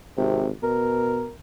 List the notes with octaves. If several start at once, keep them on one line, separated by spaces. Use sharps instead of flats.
G#1 C3
B2 A#4